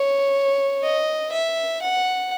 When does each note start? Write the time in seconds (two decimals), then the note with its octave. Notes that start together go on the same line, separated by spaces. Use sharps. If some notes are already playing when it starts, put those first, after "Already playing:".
Already playing: C#5
0.83 D#5
1.32 E5
1.82 F#5